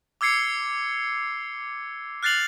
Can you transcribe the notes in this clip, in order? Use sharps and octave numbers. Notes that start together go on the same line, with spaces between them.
D6 E6 G#6 C7 C#7
F6 F#6 A6 C7 F7 F#7